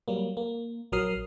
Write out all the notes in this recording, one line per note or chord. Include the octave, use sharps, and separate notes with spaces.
F#3 G3 A#3
A#3
A#1 F#3 A#4 D#6 F6 C7